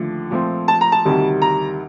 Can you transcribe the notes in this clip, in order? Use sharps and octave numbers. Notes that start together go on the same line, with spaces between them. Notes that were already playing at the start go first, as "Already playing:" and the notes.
Already playing: D#2 D3 F3 A3
A#2 F3 A3 C4
A5
A#5
A5
D2 C3 D#3 G3
A#5